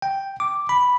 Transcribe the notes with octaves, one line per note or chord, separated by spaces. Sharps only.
G5
D6
B5